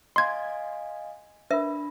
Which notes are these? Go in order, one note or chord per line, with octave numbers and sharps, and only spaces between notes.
D#5 F5 G#5 C6 G#6
D4 A#4 B4 E5 B5